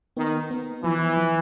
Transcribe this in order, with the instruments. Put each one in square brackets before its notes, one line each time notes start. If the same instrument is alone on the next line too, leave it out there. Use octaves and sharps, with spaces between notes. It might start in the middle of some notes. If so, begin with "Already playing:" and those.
[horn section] D#3 [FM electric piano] B3
[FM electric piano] B3
[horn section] E3 [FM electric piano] F3
[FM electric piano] F3